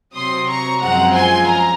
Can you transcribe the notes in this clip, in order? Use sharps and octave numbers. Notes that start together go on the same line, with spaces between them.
C3 F#3 C4 C6 D#6
A#5 C#6
F#2 F3 G#3 C4 F4 F#5 A#5
G#5 C6
A#5